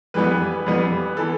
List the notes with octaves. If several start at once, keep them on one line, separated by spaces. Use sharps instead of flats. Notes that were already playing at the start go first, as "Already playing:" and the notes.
F2 E3 G3 B3 B4
F2 E3 G3 B3
E3 B3 A4